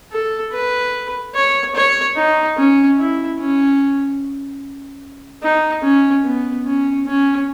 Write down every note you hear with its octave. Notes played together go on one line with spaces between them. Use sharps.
A4
B4
C#5
C#5
D#4
C#4
E4
C#4
D#4
C#4
B3
C#4
C#4